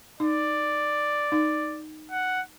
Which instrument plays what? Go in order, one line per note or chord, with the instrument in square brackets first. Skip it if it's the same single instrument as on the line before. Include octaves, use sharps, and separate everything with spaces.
[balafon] D#4 [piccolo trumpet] D5
[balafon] D#4
[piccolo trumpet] F#5